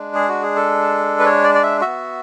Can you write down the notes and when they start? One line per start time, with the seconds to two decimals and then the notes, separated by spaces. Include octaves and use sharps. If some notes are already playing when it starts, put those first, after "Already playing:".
Already playing: G#3 D4
0.15 G#4
0.29 F#4
0.43 G#4
0.56 A4
1.20 B4
1.26 C#5
1.44 D5
1.55 D5
1.63 E5
1.81 B3 F#4 E5